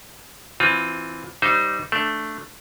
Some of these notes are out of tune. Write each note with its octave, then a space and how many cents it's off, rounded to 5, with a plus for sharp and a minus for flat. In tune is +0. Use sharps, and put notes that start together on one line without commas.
E3 +0 C4 +0 F4 +25
G3 -25 D#4 +0 C5 -25
A3 +0 D4 +0